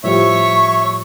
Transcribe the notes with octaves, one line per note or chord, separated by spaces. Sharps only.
A2 F3 G3 C#5 E5 C#6